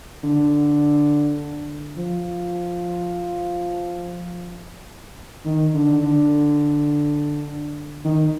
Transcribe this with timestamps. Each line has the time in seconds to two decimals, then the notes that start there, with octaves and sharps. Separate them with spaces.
0.24 D3
1.97 F3
5.45 D#3
5.74 D3
6.03 D3
8.05 D#3